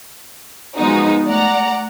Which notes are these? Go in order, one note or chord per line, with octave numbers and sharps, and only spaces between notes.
F3 G#3 B3 D#4 F#4
A3 D5 F#5 A#5